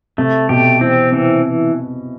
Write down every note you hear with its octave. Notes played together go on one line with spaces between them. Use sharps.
C3 A3
B2 G4
E3 C4
C3 E3